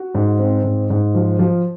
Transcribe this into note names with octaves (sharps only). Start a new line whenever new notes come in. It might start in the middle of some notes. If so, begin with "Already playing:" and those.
Already playing: F#4
G#2
C4
G#2
G#2
F3
F3